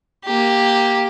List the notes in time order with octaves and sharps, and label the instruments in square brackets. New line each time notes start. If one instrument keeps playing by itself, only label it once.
[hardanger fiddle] A#3 G4